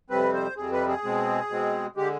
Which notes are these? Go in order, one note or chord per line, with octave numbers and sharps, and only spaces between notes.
F2 C3 G3 C4 B4
C5
F2 C3 G3 C4 G#4
B4
G#4
B2 G#3 C4
B2 G#3 C4
D3 G#3 G4